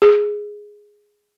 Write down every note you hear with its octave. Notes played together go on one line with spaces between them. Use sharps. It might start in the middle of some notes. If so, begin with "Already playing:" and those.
G#4